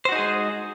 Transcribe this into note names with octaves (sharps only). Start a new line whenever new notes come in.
G#3 D#4 F#4 G#4 C5